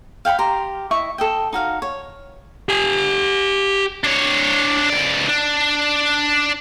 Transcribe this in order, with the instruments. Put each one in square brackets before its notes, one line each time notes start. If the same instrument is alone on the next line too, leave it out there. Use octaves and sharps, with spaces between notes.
[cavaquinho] F5 G5 G#5 B5
G4 A#5 C6
E4 D#5 E5 C#6
A4 D#5 G5
D#4 F#4 F5
C#5
[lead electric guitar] G4 G#5
[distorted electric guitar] D4 C#5
C#2 D5
D4